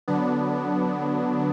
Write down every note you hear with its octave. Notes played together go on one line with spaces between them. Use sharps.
D3 F#3 B3 D4